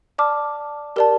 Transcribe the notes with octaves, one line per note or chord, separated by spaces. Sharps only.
D5 A5 D6 F6
G4 A#4 D5 A5